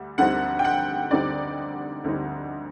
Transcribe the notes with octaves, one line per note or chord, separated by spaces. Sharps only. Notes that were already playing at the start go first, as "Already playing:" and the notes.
Already playing: D2 G3
D2 D3 G3 C4 D#4 F#5
G5
F#5
D2 D3 G3 C4 D#4 D5
D2 D3 G3 C4 D#4